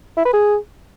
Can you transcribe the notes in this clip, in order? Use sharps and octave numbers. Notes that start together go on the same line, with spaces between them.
E4
B4
G#4